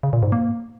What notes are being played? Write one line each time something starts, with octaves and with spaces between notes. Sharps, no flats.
C#3
A#2
G#2
A#3